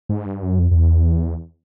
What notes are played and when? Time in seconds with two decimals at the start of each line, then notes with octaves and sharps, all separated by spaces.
0.09 G#2
0.26 G2
0.43 F#2
0.59 F2
0.71 F2
0.75 E2